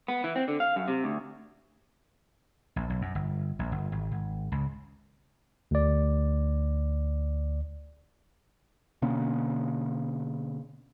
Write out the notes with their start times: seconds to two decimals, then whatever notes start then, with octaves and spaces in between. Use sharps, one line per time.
0.08 B3
0.24 E3
0.36 C4
0.48 D3
0.60 F5
0.76 F#2
0.88 C3
1.04 D2
2.76 A#1
2.90 B1
3.02 F#2
3.15 G1
3.59 A#1
3.72 G1
3.92 G#1
4.12 G#1
4.52 C#2
5.71 D2 D5
9.02 B2 D3 A#3 C#4